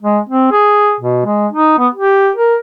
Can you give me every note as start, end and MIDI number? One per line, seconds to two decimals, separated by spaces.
0.03 0.19 56
0.29 0.52 60
0.52 0.95 68
1.01 1.23 47
1.26 1.48 56
1.53 1.75 63
1.79 1.88 59
1.95 2.30 67
2.36 2.56 70